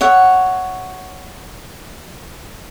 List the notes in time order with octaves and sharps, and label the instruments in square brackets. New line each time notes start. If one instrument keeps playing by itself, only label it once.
[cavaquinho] C#5 E5 F#5